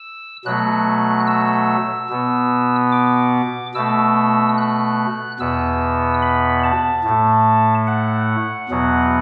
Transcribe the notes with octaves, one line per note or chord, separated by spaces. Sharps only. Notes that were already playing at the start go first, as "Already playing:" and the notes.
Already playing: E6
B2 F#3 A3 F#6
E6
B2 B3
D6
B2 A3 E6
F#6
E2 B2 B3 E6
B5
A5
A2
A3
F#5
E2 B2 F#3 B3